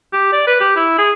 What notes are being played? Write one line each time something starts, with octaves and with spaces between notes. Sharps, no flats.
G4
D5
B4
G4
E4
G#4